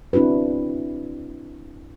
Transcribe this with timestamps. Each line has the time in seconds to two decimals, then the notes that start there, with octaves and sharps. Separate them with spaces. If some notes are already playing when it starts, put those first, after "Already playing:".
0.13 C4 D4 E4 F#4 B4